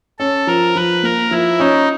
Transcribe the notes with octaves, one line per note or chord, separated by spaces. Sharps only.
C#4 A4
F3 A#4
F3 B4
A#3 A#4
F3 E4
C#4 D#4